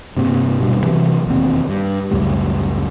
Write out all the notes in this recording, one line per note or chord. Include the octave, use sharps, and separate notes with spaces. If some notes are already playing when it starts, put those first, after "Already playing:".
G2 C3 A#3 C4
D#1 G2 B2
C3 E3 F#3
E1 D#2 C4
G2
C#2 F#2 A2 G3